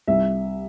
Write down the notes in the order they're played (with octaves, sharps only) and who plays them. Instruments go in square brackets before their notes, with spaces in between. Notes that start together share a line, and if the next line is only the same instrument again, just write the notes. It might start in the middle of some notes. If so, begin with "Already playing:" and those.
[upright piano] C2 E5